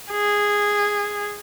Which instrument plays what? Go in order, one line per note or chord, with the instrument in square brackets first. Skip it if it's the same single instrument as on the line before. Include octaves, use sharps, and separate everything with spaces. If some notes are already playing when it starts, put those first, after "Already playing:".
[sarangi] G#4